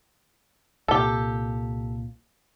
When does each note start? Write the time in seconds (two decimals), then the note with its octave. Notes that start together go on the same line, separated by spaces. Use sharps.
0.88 C2 A#2 G4 A4